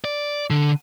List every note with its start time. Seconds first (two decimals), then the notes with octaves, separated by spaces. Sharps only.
0.04 D5
0.50 D3